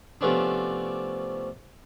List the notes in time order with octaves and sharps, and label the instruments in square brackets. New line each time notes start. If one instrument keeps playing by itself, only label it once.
[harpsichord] C3 F3 A3 B3 C#4 D4